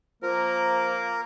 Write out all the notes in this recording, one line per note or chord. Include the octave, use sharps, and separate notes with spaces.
F3 A#3 A#4